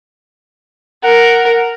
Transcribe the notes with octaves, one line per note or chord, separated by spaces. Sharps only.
A#4 F#5